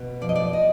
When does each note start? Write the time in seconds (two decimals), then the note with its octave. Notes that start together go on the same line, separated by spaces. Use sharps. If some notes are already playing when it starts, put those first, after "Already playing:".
Already playing: B2
0.21 F3 D5
0.29 D#5
0.36 D5
0.53 D#5